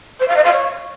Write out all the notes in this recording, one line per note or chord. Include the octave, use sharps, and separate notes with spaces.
C5
F5
D#5
F5
C#5